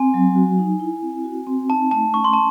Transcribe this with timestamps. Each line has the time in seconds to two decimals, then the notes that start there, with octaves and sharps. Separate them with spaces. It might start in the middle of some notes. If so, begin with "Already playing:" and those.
Already playing: C4 G#5
0.14 F#3
0.35 F#4
0.59 D#4
0.80 E4
1.02 C4
1.24 F#4
1.47 C4
1.69 D#4 A5
1.91 A3 A5
2.14 C#4 C#6
2.24 C6
2.33 A5